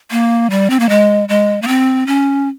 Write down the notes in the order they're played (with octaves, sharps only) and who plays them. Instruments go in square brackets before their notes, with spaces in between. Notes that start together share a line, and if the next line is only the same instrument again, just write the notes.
[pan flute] A#3
G3
C4
A#3
G#3
G#3
A#3
C4
C#4